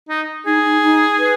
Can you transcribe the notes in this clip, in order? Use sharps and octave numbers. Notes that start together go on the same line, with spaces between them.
D#4
D#4 G#4
D#4
D#4
B4